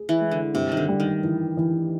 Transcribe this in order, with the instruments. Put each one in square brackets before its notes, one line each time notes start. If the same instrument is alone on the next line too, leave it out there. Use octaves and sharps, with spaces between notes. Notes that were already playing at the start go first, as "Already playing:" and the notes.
Already playing: [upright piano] G#4
[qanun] E3
[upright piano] G#3
[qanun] D3
[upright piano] G2 [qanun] C3
[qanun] D#3
D3
[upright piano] G3
[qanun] D#3
[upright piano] E3
E3